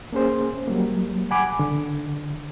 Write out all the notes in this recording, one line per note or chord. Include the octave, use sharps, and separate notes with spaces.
A#3 C#4 G#4 C5
F#3 G3 A#3
F#5 G#5 B5 D6
D3